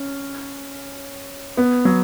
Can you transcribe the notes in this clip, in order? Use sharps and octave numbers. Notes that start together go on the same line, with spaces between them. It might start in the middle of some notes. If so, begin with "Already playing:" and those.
Already playing: C#4
B3
F#3